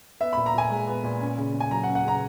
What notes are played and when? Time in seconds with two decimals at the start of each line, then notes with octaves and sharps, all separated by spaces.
0.20 B3 E5
0.33 A#2 B5
0.46 A#5
0.55 A#2 G#5
0.70 G#3
0.87 B3
1.03 A#2
1.21 C#4
1.38 C#3
1.54 C#3
1.60 G#5
1.71 F#3 A#5
1.83 F#5
1.87 C#4
1.95 F#5
2.04 C#3 A#5